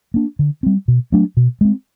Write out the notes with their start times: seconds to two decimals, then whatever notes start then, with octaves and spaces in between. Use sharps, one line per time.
0.14 A#3 D4
0.39 D3
0.63 G3 C4
0.88 B2
1.12 F#3 A3 D4
1.37 B2
1.61 G#3 C4